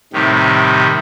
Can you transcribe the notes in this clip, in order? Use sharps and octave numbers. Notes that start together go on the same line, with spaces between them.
A2 C3 D#3 G3